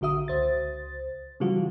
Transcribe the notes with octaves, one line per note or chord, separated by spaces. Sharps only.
A#1 D3 F#4 E5 D#6
C#2 C5 A6
C#3 E3 F3 G3 F4 F#4